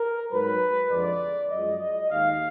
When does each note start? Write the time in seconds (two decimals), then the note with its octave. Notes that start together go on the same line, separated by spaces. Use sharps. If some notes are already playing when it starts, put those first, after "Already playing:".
Already playing: A#4
0.31 G#2 F#3 B4
0.90 F2 D3 F3 G#3 D5
1.50 F#2 F3 G#3 D#5
1.81 D#5
2.11 D#2 D#3 G#3 F5